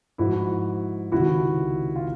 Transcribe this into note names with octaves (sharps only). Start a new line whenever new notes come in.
G#2 F3 E4 F#4
C#2 C3 D#3 E4 F#4
F4